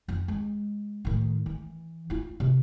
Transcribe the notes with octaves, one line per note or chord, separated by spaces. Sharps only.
F2
G#3
A2 D#3
E3
E4 F4
C3